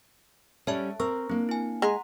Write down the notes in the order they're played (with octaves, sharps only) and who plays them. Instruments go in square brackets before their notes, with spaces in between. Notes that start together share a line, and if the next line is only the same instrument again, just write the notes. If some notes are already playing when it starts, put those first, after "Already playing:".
[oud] G3 C#4 [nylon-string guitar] A4 [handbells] C#5 E5 A5
[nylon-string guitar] C4 [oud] A#4 [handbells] C#6 E6
[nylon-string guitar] A#3 D4 [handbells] C4
[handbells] E4 G#5
[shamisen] G#3 [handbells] F#5 A#5 C6